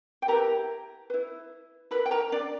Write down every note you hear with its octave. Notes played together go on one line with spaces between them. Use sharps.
G5
E4 G4 A#4 B4 A#5
E4 B4
E4 A#4 B4 B5
G5
A#4 A#5
D4 D5